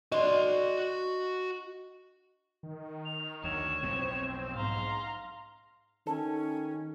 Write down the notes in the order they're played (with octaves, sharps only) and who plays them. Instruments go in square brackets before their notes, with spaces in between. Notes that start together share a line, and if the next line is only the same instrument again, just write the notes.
[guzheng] D4 [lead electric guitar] F#4 C6 [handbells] D#5
[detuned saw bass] D#3
[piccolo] F7
[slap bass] D2 [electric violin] C#5 [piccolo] E7
[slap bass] B1 F2 A2 [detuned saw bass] C4
[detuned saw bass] G#2 [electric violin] F5 A#5 [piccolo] C6
[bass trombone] D#3 [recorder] C#4 [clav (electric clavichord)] A4